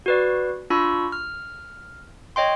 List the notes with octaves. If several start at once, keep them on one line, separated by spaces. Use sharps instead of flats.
F#4 B4 D5
D4 F4 B5 C#6 E6
F6
C#5 D#5 G5 C6